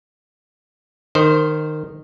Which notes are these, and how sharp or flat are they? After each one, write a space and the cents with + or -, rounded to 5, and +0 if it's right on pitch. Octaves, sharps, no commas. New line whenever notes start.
D#3 -15 C5 +0